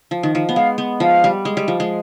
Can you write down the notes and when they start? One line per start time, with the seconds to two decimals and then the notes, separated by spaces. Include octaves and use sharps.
0.11 F3
0.23 D#3
0.35 F3
0.49 B3
0.56 G#3 F5
0.78 B3
1.00 F3 F5
1.24 G3
1.45 G#3
1.57 G3
1.68 F3
1.80 G#3